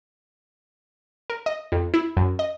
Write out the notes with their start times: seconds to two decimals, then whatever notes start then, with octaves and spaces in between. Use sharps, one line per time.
1.30 A#4
1.46 D#5
1.72 F2
1.94 E4
2.17 F#2
2.39 D#5